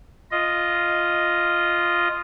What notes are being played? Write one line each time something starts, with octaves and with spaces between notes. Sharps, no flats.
F4 D#5